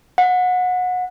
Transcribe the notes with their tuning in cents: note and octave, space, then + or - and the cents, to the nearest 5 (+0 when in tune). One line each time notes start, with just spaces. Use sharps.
F#5 -25